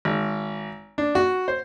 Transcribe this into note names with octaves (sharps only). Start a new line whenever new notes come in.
G#1
D4
F#4
C5